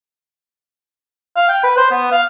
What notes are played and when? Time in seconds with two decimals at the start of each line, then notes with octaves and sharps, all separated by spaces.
1.37 F5
1.49 G5
1.64 B4
1.77 C5
1.91 B3
2.12 F5